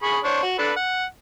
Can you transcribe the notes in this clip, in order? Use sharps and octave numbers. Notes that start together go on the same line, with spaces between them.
G#4 B5 C#6
D4 C5 C#5
F#4
D4 A4 B4
F#5